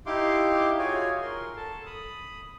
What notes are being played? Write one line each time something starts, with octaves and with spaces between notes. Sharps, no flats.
D#4 E4 G4 F5 C6 D6
F4 F#4 G#4 C#5 G#5
A#4 C6
A4 A5
B5 D#6